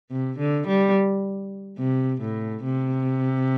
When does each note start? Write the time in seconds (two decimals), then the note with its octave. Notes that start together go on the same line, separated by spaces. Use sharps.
0.11 C3
0.39 D3
0.68 G3
1.79 C3
2.21 A2
2.64 C3